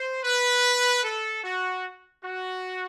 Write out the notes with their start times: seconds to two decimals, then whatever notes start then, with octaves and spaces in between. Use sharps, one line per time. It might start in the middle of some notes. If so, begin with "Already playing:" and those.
Already playing: C5
0.24 B4
1.04 A4
1.44 F#4
2.24 F#4